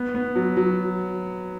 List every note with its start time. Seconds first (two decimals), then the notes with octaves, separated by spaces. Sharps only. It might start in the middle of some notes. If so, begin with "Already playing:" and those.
Already playing: B3
0.15 B3
0.36 F#3
0.57 F#3